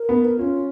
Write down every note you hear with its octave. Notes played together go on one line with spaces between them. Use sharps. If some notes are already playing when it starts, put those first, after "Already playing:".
Already playing: A#4
B3
C#4 F4